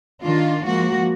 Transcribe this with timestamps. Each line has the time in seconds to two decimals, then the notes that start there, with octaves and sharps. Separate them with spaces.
0.21 D#3 D4 F4
0.65 F3 G#3 A#3 F#4